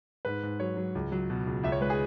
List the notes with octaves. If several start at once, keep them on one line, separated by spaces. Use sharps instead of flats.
G#2 B4
G#2
F#3 C#5
F#3
C#2
F#3
B2
C#2
C#2 E5
C#5
G#3 B4
G#4